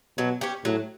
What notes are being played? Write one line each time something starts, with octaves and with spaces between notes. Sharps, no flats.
B2 F#3
C#4 G4
A2 F#3